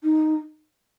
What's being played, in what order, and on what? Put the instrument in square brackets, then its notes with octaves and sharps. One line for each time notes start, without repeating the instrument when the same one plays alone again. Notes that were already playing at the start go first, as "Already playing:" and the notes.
[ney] D#4